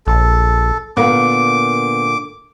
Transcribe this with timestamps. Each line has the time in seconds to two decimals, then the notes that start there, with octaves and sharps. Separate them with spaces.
0.07 A#1 A4
0.97 A#2 D3 A#3 B3 D6